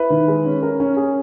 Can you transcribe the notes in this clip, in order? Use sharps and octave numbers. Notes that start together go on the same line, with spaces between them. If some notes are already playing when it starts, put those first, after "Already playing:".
Already playing: E4 B4
D#3
G#3
C#4
C#4 A#4
C#4
C#4 G#4